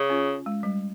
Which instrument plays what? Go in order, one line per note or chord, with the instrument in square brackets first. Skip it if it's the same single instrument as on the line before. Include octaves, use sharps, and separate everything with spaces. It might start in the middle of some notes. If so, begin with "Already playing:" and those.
Already playing: [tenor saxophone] C#3
[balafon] C#4 F4
G#3
G3